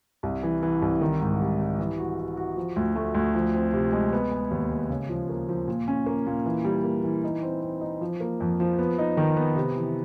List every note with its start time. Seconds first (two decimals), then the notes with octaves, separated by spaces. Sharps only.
0.23 C2
0.43 E3
0.63 E3
0.82 C2
1.01 D#3
1.21 G#2
1.41 G3
1.59 G3
1.79 E3
1.98 F#4
2.18 F#4
2.37 F#4
2.56 F3
2.76 D2
2.95 A3
3.14 D2
3.34 F3
3.55 C4
3.74 C3
3.93 G#3
4.13 B3
4.31 G#3
4.51 D#2
4.71 G#3
4.90 C#3
5.09 F3
5.29 A#3
5.49 F3
5.68 A#2
5.88 C#4
6.06 A#3
6.27 A#2
6.46 E3
6.65 G3
6.84 A#3
7.04 E3
7.24 D#4
7.42 C4
7.62 C4
7.81 D#4
8.01 F3
8.20 A#3
8.40 F2
8.60 F3
8.79 B3
8.98 D#4
9.17 D#3
9.36 B3
9.56 C3
9.76 E3